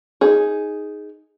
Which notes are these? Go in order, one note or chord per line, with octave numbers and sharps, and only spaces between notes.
D#4 G#4